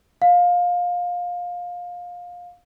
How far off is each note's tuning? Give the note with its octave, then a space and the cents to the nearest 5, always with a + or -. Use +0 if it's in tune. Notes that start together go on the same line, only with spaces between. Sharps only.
F5 +20